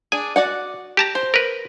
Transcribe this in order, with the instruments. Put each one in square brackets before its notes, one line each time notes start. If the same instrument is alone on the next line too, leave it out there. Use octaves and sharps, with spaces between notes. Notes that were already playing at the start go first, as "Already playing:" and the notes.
[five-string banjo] D4 G#4 [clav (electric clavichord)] G#5
[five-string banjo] F#4 D5 F#5
[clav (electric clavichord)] G4 A5 A#5
[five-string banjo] C5
[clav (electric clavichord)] A#4 B4